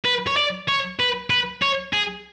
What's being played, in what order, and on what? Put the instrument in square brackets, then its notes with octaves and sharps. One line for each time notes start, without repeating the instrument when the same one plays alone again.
[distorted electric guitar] B4
C#5
D5
C#5
B4
B4
C#5
G#4